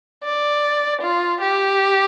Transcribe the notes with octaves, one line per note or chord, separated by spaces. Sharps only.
D5
F4
G4